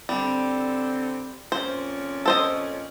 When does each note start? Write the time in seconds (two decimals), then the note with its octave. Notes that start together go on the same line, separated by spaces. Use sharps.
0.09 D3 G3 C4
1.52 F2 A#2 C#4 C5
2.26 A4 C5 D#5